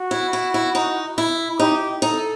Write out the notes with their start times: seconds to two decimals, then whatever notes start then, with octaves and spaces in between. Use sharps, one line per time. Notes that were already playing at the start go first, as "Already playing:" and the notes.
Already playing: F#4
0.11 E4
0.33 E4
0.54 E4
0.75 D#4
1.18 E4
1.60 D#4 G4
2.02 D#4 A4